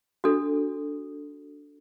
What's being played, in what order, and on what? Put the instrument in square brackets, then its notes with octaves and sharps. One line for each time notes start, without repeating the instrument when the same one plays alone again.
[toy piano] D4 F#4 A4